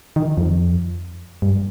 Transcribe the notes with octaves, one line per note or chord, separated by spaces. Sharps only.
D#3
F2
G2